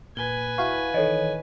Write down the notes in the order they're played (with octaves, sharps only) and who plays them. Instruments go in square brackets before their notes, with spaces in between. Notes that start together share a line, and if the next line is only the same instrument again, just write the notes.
[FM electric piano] A#2 [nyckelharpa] B4 G#5 [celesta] G7
[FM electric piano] E4 F#4 F5 [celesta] C#6
[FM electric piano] D#3 E3 [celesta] A4 C#5 D#5